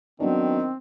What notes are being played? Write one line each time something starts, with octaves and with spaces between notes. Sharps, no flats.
D#3 F#3 B3 C4 D4